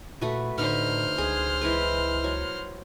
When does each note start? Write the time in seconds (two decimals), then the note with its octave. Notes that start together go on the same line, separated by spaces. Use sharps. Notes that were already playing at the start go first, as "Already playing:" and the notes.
0.21 A#2 A3 F#4 B4
0.58 A2 D3 D#4 B4 C5 F6
1.18 C#2 G#4
1.61 E3 G#3 B4
2.24 F#3